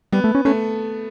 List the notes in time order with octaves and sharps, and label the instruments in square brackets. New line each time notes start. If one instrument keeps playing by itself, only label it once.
[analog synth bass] G3 [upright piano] B3
[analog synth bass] A3
C#4
[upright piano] A3 [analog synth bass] C#4